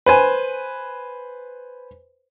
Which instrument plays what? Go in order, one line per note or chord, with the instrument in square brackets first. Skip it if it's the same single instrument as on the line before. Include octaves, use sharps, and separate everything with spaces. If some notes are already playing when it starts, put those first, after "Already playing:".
[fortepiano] B4 C5 G#5